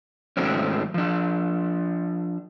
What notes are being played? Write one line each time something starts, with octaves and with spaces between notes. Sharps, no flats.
G#2 D#3 F#3 A3 C4 C#4
F3 D4